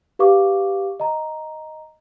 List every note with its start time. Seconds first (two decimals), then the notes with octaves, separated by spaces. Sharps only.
0.19 G4 B4 F5 C#6 D6
1.00 D#5 A#5